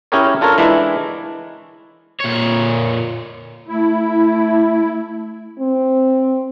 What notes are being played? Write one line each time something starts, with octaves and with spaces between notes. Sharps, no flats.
C#4 E4 G4 G#4 A#4 C#5
D4 F4 A4 A#4 C#5
E3 G#3 D4 E4
A#2 C#5
A3 E4
C4